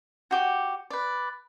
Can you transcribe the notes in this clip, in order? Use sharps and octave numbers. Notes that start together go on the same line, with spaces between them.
F#4 G4 D6
B4 D5